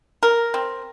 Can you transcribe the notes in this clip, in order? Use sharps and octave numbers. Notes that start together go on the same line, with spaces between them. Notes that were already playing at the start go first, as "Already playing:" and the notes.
A#4
C4